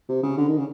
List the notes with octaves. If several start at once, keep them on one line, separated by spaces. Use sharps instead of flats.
C3
C#3
D3
D#3
C#3